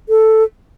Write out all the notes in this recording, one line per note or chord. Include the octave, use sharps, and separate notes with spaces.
A4